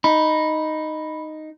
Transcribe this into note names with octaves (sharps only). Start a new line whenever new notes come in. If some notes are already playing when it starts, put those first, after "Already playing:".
D#4 B5